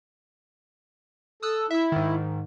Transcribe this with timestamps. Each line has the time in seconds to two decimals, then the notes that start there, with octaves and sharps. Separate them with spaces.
1.42 A4 D#6 E6 F#6
1.71 E4 E5 E6
1.92 G#2 D#3